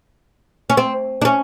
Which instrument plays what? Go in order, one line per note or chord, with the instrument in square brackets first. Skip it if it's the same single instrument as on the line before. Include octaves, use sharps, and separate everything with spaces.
[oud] C#4
C4
D4
C#4